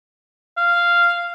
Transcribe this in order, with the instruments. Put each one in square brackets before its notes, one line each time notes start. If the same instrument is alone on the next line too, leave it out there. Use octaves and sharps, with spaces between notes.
[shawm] F5